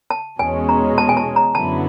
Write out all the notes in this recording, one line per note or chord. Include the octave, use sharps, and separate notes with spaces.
A5
E2 B2 G#3 C#4 G#5
A#5
A5
G#5
A5
A#5
F#2 D3 F#3 B3 E4 A5